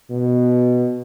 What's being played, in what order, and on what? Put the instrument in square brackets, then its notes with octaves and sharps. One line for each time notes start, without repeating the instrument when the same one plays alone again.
[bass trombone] B2